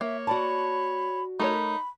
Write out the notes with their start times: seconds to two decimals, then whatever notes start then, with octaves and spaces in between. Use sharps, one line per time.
0.01 A#3 C#5 E5
0.27 F#4 D5 A5 B5
1.40 A3 D#4 A#4 C#5 B5